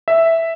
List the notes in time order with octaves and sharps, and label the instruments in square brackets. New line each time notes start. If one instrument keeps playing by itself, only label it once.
[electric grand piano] E5